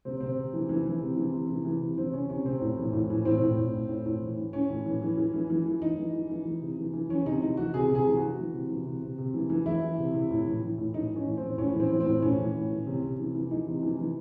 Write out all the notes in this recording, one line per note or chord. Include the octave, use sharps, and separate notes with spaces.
C3 C4
C3 C4
C3
E3
E3
E3
C3
E3
C3
E3
E3
C3
E3 C4
C3 C#4
C3 C#4
C3 C4
A2
E3
A2
E3
A2 C4
A2
A2
A2
A2
A2
E3
E3
E3 C#4
A2
E3
E3
E3
E3
E3
E3
E3 D#4
E3
E3
E3
E3
C3
E3
E3
E3 C#4
C3 D#4
E3 D#4
E3 F#4
C3 G#4
C3
G#4
E3
E3 F#4
E3
C3
E3
C3
C3
C3
E3
E3
E3 E4
E3
C3
C3
A2
E3
E3
A2
E3 D#4
E3
C#4
A2
C4
E3
A2 C#4
E3
C4
E3
C4
A2
A2 C#4
E3
A2
E3
C3
C3
E3
E3
E3 D#4
C3
E3
E3